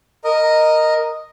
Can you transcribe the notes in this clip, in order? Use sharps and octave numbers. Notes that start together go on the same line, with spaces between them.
A#4 D#5